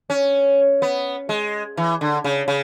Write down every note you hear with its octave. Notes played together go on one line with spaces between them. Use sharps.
C#4
B3
G#3
E3
D3
C#3
C#3